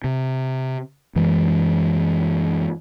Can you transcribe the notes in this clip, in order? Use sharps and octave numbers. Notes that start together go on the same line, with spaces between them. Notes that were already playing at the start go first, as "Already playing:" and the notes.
C3
F#2 E3 G#3